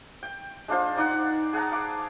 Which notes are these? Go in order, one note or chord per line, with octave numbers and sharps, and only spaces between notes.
G5
G#3 D4 F4 C5
D#4 D5 F#5
G#4 F#5 A5 A#5
F5 D6